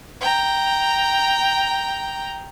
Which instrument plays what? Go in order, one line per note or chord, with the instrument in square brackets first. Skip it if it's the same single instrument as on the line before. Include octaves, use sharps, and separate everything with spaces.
[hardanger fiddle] G5 A#5